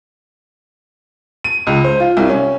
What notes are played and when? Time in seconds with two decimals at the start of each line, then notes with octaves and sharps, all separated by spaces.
1.44 D#7
1.67 C#2
1.84 C5
2.00 F4
2.17 C2
2.29 C#4